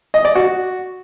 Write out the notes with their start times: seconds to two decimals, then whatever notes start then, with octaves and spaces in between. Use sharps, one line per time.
0.14 D#5
0.25 D5
0.35 F#4